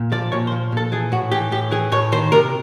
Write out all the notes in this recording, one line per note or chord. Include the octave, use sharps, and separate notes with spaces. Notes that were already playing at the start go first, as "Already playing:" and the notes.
Already playing: A#2
F3 D5
A#2 C#5
C5
F3
A#2 A4
E3 G#4
A2 F#4
E3 G4
A2 G4
E3 G#4
A2 C#5
D#3 C5
C3 A#4